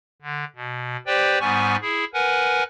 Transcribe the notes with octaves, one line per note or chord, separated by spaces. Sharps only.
D3
B2
G4 B4 C5 D5 G5
G#2 G3 B3 G#5 C#6
E4 G#4
A#4 B4 F#5 G#5